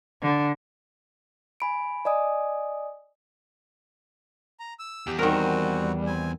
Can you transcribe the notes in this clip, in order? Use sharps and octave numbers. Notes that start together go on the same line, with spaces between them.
D3
G#5 B5 D7
D5 D#5 G#5 D#6
A#5
E6
E2 G4
D#3 G3 C4 F#4 A#4
C4 G#5